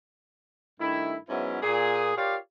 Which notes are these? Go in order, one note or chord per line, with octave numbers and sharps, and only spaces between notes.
G2 D#3 A3 E4
G#2 F#3 B3 C#4 E4 E5
A#2 G#4
F4 G4 A#4 C#5 D5 F5